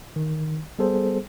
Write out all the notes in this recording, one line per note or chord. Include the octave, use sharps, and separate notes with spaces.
D#3
G3 B3 G#4 A4 C5